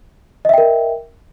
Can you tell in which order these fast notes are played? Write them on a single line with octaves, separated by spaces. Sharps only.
D#5 E5 G5 A#4